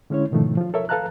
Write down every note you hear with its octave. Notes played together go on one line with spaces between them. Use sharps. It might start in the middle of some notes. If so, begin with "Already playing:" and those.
D3 G#3 C#4 E4 C#5
G#2 B2 D#3 F3 A3
F3 F4
A4 A#4 C#5 E5
A4 B4 F5 A5 A#5 F#6